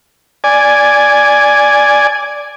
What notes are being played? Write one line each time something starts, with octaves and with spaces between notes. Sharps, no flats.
D5 G#5